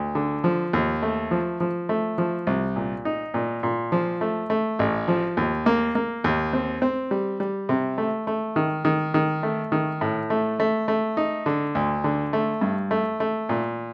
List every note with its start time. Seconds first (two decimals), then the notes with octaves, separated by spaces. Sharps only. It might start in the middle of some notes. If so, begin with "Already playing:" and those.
Already playing: D2
0.15 D3
0.44 F3
0.73 D#2
1.03 A3
1.31 F3
1.60 F3
1.89 A3
2.18 F3
2.47 C2
2.76 A#2
3.05 D#4
3.34 A#2
3.63 A#2
3.92 F3
4.21 A3
4.50 A3
4.79 A1
5.08 F3
5.37 D#2
5.66 A#3
5.95 A#3
6.24 D#2
6.53 C4
6.82 C4
7.11 G3
7.40 G3
7.69 C3
7.98 A3
8.27 A3
8.56 D#3
8.85 D#3
9.14 D#3
9.43 A3
9.72 D#3
10.01 A2
10.30 A3
10.60 A3
10.88 A3
11.17 D#4
11.46 D3
11.75 D2
12.04 D3
12.33 A3
12.61 G2
12.91 A3
13.20 A3
13.49 A#2